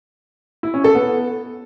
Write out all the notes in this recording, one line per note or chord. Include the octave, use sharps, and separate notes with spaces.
E4
C#4
A4
B3